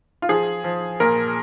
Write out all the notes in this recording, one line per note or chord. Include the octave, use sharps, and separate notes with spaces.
F4
F3 G#4
F3
A#2 A#4